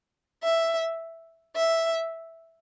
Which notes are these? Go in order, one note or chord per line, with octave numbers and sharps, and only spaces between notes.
E5
E5